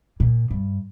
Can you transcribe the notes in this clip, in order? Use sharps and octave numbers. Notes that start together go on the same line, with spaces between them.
A#2
G2